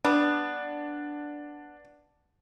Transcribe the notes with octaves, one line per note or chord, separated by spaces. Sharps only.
G3 B3 D4